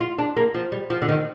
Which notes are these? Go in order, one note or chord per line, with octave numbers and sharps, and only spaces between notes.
F4
D4
A#3
F3
G3
F3
D3
D#3